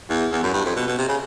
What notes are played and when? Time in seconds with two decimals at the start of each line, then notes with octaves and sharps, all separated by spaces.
0.10 E2
0.32 E2
0.43 F#2
0.54 G2
0.65 F2
0.76 B2
0.87 B2
0.98 C3
1.08 C#3